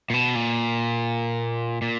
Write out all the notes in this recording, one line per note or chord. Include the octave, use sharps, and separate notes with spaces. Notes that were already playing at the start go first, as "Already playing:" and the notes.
A#2
B2
A#2
A#2